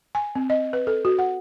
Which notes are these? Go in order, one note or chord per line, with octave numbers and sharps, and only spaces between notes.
G#5
C4
D#5
B4
A4
F#4
F#5